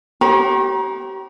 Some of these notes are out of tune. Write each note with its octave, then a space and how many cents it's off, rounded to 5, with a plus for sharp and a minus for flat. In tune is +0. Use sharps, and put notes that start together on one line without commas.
G4 -35 C#5 -45 A#5 +30